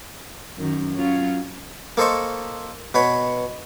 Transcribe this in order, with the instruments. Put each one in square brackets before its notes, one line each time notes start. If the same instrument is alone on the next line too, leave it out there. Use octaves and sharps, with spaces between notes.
[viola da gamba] F#2 D#3
F#3 C#4 F4
[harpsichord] A#3 A4 C5 D#5 C#6
B2 B4 C#5